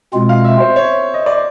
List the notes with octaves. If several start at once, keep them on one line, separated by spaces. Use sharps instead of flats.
B2 G#3 C4 F4
F5
E5
C5
C#5
D#5
D5